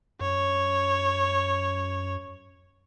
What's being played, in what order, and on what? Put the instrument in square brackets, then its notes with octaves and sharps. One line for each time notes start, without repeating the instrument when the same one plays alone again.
[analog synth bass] F#2 [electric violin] C#5